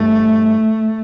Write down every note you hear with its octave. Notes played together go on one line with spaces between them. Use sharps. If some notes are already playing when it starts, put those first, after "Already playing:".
Already playing: G2 E3 G3 A3